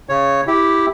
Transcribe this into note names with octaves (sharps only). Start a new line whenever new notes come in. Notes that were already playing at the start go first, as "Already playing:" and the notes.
C#3 C#5
E4 G4